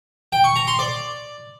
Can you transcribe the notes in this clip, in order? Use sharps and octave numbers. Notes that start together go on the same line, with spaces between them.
G5
C#6
A#5
C6
D5